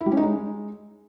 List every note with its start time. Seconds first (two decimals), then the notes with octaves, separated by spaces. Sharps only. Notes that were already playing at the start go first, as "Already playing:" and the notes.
0.01 E4
0.06 G3
0.12 C#4
0.17 D#4
0.23 G#3